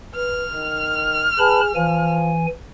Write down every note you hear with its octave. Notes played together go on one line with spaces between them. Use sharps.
B4 F6
D#3
G#4 B4 A5 B5
E3 F3 G#5